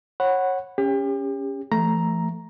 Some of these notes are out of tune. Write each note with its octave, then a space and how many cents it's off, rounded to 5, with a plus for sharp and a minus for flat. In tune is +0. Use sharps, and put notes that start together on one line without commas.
C#5 -25 F#5 +0 B5 +0
C#4 +5 G4 +35
E3 +45 A3 +5 A#5 +5